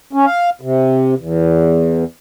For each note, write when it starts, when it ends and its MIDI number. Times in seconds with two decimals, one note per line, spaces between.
0.13 0.25 61
0.26 0.50 77
0.61 1.15 48
1.18 2.04 40